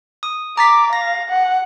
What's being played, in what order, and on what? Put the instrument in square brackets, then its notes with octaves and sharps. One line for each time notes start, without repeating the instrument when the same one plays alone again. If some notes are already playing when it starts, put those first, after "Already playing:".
[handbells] D#6
[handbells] A#5 A6 B6 [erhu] D6
[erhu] F5 [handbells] A#6
[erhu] F#5